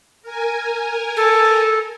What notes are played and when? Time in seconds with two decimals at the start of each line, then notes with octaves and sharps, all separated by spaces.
0.22 A#4 G#5
1.17 A4